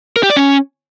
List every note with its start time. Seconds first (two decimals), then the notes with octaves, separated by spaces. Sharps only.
0.16 A#4
0.23 G4
0.30 D5
0.37 C#4